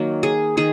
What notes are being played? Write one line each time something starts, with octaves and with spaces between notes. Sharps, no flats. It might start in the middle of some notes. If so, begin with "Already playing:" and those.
Already playing: D#3 F#3 A#3
G#4
D#3 G#4